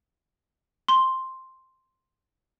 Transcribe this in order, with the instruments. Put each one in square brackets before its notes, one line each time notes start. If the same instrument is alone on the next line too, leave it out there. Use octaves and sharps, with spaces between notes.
[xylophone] C6 G7